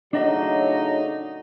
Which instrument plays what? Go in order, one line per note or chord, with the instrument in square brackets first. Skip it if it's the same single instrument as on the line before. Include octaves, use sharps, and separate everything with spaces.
[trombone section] A2 C#3 F#3 [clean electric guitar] D4 D#5 [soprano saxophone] D#4